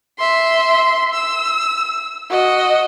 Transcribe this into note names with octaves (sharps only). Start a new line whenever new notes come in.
E5 C6
E6
F#4 D#5